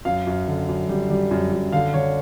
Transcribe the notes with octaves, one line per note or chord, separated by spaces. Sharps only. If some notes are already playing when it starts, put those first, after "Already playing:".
F#2 F5
F#2
D3
F#2
G3
G3
F#2
F#2
D3 F5
D3 C#5